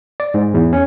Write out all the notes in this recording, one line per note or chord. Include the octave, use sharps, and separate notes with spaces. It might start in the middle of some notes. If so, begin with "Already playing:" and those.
D5
G#2
E2
C#4